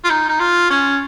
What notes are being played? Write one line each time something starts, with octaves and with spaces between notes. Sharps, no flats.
F4
D#4
D#4
F4
C#4